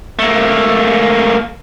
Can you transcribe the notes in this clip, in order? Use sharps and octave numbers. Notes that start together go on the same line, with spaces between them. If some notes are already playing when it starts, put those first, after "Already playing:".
A3 A#3